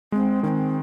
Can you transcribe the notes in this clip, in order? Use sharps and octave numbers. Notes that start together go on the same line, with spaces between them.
G#3 C4
D#3 C4 C#4